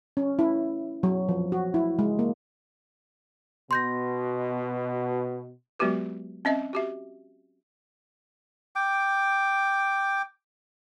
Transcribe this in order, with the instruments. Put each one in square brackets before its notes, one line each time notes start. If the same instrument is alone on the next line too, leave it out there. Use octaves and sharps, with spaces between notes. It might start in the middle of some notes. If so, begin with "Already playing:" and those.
[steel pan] C#4
E4
F#3
F3
F#4
E4
G#3
A#3
[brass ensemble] B2 [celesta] C6 G6 A#6
[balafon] F#3 G#3 B3 F#4 G4 B4
C4 C#4 D#5 E5
F#4 G4 E5
[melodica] G5 D6